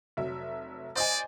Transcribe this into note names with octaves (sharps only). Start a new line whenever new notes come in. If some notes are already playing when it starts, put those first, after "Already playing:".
F1 F#3 E5
C5 D5 D#5 G#5